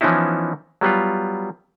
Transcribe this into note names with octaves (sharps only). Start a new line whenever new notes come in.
E3 F3 B3 C#4 D#4 E4
F#3 G3 B3 F4